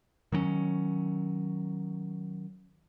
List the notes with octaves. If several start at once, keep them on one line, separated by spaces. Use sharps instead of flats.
D#3 F#3 A#3 C#4